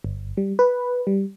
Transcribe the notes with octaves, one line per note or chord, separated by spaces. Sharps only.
G1
G3
B4
G3